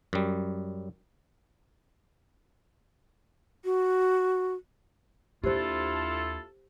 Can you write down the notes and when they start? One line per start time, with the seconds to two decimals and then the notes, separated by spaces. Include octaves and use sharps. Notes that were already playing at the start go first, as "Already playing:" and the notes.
0.13 F#2 G3
3.65 F#4
5.43 D#2 D4 E4 F4 G4 A4 C5